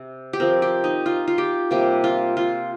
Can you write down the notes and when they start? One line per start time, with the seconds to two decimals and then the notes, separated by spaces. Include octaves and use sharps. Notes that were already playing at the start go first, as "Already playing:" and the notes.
Already playing: C3
0.33 G4
0.40 F3 C4 A#4
0.62 G4
0.84 D#4
1.06 F4
1.28 F4
1.38 G4
1.71 C3 G3 A#3 G4
2.04 F4
2.37 F4